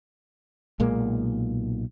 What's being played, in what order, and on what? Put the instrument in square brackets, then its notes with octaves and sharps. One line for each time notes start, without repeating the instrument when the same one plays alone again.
[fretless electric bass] B1 A#2 G#3 A#3